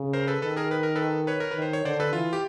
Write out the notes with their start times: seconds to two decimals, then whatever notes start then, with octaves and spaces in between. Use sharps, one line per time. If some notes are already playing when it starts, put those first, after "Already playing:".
Already playing: C#3
0.13 A#4 C5
0.27 A4 B4
0.42 D#3 A4 B4
0.56 G#4 A#4
0.71 B4
0.83 A#4
0.95 A4 B4
1.27 B4 C#5
1.40 A#4
1.51 D#3 B4
1.62 C5
1.73 C#5
1.85 D3 C5 D5
2.00 A4 B4
2.13 E3 F4
2.33 G4